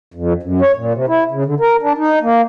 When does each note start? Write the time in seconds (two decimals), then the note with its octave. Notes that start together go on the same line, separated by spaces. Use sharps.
0.14 F2
0.43 F#2
0.61 C#5
0.77 A#2
0.93 C3
1.08 E4
1.31 C#3
1.46 D3
1.60 A#4
1.82 D4
1.98 D#4
2.22 A#3